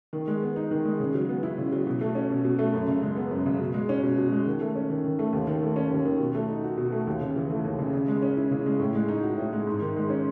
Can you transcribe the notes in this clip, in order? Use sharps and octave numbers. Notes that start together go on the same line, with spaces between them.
D#3
G#3
B3
D#4
D#3
G#3
C#3
F#3
B3
E4
C#3
F#3
B2
A3
C#4
B2
B2
A3
F#2
C#3
G#3
B3
F#2
C#3
B2
G#3
C#4
B2
B2
G#3
D#3
A3
C#4
D#3
D#3
A3
D#2
D#3
A3
C#4
D#2
D#3
B2
A3
D#4
F#4
B2
A3
D#2
C#3
E3
A3
D#2
C#3
C#3
G#3
C#4
E4
C#3
G#3
A2
G#3
D#4
F#4
A2
G#3
G#2
D#3
G#3
C#4